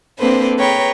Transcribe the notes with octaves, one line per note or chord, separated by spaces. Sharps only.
A#3 C4 D4 A4 B4 C5
G#4 B4 C#5 G5 A#5